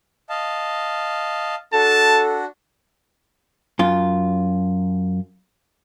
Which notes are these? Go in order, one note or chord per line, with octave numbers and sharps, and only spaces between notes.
D#5 F5 A5
D4 F#4 A4 A5
F#2 F4